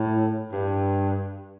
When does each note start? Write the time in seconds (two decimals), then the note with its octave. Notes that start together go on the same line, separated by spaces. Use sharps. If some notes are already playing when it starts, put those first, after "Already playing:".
Already playing: A2
0.52 G2